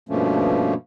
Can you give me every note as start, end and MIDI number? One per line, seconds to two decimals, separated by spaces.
0.09 0.74 43
0.09 0.74 47
0.09 0.74 53
0.09 0.74 57
0.09 0.74 58
0.09 0.74 61